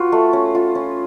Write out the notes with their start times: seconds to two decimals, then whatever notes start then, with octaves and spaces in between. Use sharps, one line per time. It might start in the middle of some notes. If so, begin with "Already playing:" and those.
Already playing: F4 F#4 B4
0.12 A3
0.33 C#4
0.55 F4
0.75 C#4